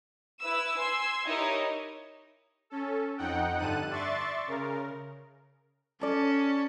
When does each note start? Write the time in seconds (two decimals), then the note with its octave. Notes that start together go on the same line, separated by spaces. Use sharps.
0.42 E4 B4 E6
0.78 G#5 C6 E6 G#6
1.25 D#4 E4 G4 A#4 C#5 D#5
2.70 C#4 A4
3.17 F2 D#4 F#5 G5
3.58 G2 D3 A5 F#6 D#7
3.90 D5 E5 C6 C#6 A6
4.47 C#3 A#4
6.01 C#4 A4 D5 A5